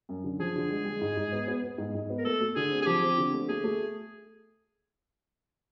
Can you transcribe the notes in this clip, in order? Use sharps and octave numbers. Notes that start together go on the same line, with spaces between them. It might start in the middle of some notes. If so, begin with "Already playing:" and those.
F#2
D3
F3 G#4
D3
G#3
G#3
G#2
G#2
B3
B3
B3
G#2
G#2
B3
A#4
A3 A4
A3
D3 G#4
C4
G#4
F3 G4
C4
D3
A3
A3 G#4
A3